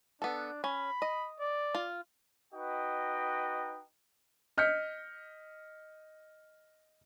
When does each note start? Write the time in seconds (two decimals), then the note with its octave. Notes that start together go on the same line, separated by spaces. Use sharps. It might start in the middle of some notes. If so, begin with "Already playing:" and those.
0.22 B3 D4 A4
0.64 C#4 B5
1.02 D#5
1.40 D5
1.75 F4
2.54 D#4 F#4 B4 D#5 G5
4.58 D#5 F6 G6 B6 C#7